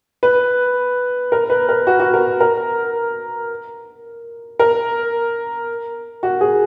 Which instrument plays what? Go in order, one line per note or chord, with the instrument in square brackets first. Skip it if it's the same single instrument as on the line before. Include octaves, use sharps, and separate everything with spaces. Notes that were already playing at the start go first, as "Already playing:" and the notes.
[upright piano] B4
A#4
B4
A#4
F#4
F#4
A#4
A#4
A#4
F#4
G#4